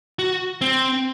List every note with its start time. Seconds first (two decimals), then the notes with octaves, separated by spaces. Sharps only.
0.19 F#4
0.61 C4